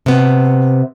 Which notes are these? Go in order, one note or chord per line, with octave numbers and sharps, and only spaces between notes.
C3 B3